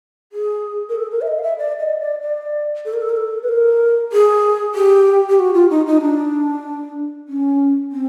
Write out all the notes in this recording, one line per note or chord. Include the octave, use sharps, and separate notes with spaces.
G#4
A#4
A4
A#4
E5
D#5
F5
E5
D5
D#5
D5
D5
A4
A#4
A4
A#4
A4
B4
A#4
G#4
G4
G4
F#4
F4
D#4
D#4
D4
C#4
C4